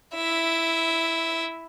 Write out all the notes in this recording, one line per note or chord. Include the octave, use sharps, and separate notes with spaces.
E4 E5